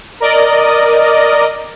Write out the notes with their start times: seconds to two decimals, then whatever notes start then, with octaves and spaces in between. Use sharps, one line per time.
0.20 A#4 D5 D#5